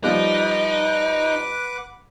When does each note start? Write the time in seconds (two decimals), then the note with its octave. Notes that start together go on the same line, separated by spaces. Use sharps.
0.04 F3 G3 D#4 B4 F#5 D6